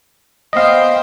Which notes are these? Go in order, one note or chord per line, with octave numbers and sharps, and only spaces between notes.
B3 C5 D#5 F5 G5